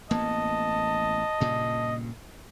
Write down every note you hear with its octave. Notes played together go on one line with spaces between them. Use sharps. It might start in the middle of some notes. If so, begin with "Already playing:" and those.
A1 A#3 B3 D#5 A5
G2 A#2 C#3